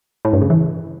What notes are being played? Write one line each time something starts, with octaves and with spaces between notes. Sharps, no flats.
A2
G2
C#3
E3